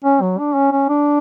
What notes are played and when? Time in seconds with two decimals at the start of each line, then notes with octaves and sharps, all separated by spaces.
0.04 C#4
0.21 F#3
0.38 D4
0.55 C#4
0.72 C#4
0.89 D4